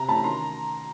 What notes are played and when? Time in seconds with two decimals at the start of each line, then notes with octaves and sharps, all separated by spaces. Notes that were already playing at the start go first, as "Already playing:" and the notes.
Already playing: C3 A#5
0.08 E3 A3 C#4 A5 B5
0.24 D#3 A#5 C6